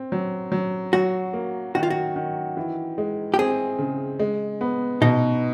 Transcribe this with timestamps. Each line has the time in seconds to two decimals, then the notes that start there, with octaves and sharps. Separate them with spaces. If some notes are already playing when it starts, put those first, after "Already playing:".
Already playing: C4
0.12 F#3
0.52 F#3
0.93 F#3 F#4
1.33 A#3
1.75 D#3 F#4
1.83 F4
1.90 F#4
2.16 D#3
2.57 E3
2.98 G#3
3.34 G4
3.39 C4 G#4
3.79 C#3
4.19 G#3
4.61 B3
5.01 B2 D#4